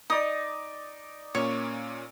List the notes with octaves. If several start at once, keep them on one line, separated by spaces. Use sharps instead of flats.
D#4 D5 D#6
A#2 A#3 C#4 C#5